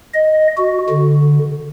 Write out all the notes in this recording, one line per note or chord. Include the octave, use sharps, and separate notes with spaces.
D#5
F#4
D3